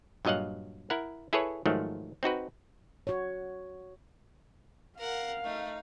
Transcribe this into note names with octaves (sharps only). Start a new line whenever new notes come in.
G2 A#2 F#3 D#5 F5 F#5
E4 A#4 F#5
E4 G#4 A4 B4 C#5
G#2 D#3 F3 F#3 A3
C4 D#4 F#4 B4
F#4 C#5
A#4 F5 F#5
A3 D#4